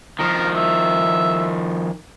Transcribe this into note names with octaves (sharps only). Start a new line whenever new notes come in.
D#3 F3 A#4
E5